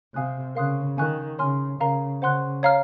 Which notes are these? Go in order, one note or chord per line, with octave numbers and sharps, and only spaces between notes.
C3 F5 G#5 D#6 F#6
C#3 A#4 F5 C6 D#6 F#6
D#3 F5 G#5 C#6 F#6
C#3 C#5 G#5 C6 F6
C#3 A#4 F5 A#5
C#3 C5 F#5 C6 F#6
C#5 F5 A#5 F6